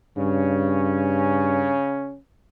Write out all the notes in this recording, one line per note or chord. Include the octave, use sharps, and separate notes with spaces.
G2 C#3 C#4